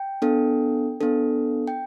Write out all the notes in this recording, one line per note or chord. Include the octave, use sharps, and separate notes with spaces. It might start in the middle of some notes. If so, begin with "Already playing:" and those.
Already playing: G5
B3 D4 A4
B3 D4 A4
G5